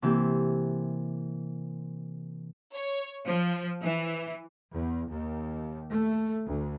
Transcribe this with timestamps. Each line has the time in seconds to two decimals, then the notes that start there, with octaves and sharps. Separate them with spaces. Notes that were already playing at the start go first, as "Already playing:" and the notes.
0.02 C3 E3 A#3 G4
2.73 C#5
3.26 F3
3.83 E3
4.72 E2
5.10 D#2
5.91 A3
6.45 D2